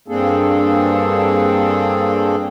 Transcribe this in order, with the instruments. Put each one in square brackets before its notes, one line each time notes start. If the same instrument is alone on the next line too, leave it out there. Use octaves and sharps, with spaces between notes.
[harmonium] G2 A#3 C4 D4 G#4 A4